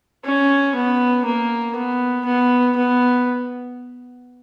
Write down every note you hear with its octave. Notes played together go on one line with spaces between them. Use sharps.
C#4
B3
A#3
B3
B3
B3